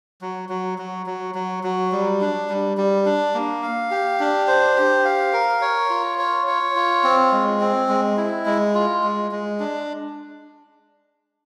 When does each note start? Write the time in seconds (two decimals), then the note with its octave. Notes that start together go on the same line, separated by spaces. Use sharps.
0.21 F#3
0.49 F#3
0.78 F#3
1.06 F#3
1.35 F#3
1.64 F#3
1.92 G3
2.21 D4
2.49 G3
2.77 G3
3.05 D4
3.34 A#3
3.62 F5
3.91 G4
4.20 D4
4.47 C5
4.76 G4
5.05 F5
5.33 A#4
5.62 C#5
5.90 F4
6.18 C#5
6.47 C#5
6.76 F4
7.04 C4
7.32 G#3
7.61 C4
7.89 G#3
8.17 E4
8.46 G#3
8.75 F4
9.03 G#3
9.31 G#3
9.60 D4